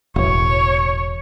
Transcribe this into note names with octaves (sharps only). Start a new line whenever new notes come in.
E1 A1 C#5